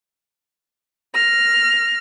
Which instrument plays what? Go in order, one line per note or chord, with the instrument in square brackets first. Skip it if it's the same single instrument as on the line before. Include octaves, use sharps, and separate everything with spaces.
[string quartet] F6 [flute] A#6